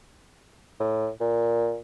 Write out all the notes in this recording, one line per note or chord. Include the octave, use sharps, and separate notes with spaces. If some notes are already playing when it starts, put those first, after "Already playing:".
A2
A#2